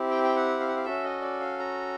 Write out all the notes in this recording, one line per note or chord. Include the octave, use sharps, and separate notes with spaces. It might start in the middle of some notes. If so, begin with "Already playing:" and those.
Already playing: C4 E4 G4
G5
G5
F#5
F5
F#5
F5
C#4 F#4 A4 E5
D#5
D5
F5
A#5